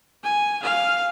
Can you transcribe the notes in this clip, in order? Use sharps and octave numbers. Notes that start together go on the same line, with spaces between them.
G#5
F5